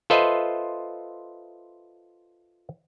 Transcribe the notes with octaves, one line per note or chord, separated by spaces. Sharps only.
F4 A4 B4 C5 D#5 E5